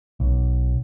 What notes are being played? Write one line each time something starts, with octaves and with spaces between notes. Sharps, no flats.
B1